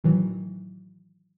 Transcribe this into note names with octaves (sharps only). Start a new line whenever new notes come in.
A2 D#3 E3 F#3